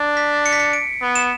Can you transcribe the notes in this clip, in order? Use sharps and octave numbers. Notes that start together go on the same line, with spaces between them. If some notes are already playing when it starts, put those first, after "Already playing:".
Already playing: D4
B6
C#7
B6
C#7
D7
B3
E7